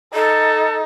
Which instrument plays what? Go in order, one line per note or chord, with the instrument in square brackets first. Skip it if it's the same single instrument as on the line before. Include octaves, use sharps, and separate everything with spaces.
[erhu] D#4 [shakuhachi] A4